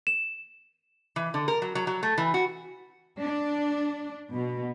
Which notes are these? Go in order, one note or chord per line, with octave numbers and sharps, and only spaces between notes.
E7
E3
D3
A#4
F#3
F#3
F#3
A3
E3
F#4
D4
B2